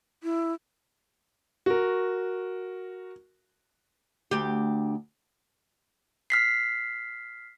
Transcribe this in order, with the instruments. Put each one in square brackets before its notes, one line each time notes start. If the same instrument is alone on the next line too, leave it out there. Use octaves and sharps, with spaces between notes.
[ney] E4
[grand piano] F#4 A#4
[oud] D2 G4
[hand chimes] F6 B6 C7